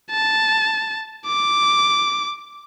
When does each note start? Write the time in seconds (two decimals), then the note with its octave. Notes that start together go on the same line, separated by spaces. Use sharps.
0.11 A5
1.27 D6